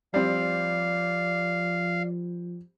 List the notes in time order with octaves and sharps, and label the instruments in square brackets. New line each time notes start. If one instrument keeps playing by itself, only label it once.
[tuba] F3 [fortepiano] G3 C4 [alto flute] D5 [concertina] F5